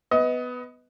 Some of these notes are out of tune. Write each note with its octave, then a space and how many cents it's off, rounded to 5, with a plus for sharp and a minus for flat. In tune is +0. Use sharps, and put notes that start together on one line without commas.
B3 +10 D#5 +25